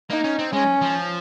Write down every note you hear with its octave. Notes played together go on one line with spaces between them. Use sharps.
A#3 D#4
C#4
C4
G#3 C#4
F3